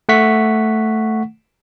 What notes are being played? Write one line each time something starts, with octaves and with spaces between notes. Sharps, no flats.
A3 F#5 C#6 B6